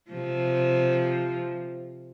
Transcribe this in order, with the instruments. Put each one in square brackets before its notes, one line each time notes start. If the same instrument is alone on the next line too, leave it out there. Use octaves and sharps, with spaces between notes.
[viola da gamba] C3 F3